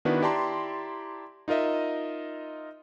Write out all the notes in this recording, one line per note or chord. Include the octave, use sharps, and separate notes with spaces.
D#3 B3 D4 E4 F#4 B4
E4 G4 D5 A5 A#5 C6
D#4 F4 A#4 D#5 E5